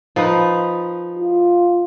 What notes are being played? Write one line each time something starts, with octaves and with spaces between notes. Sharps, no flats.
F3 D#4 B4
F4